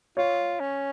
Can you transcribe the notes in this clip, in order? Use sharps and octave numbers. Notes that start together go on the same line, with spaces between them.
F4 C#5
C#4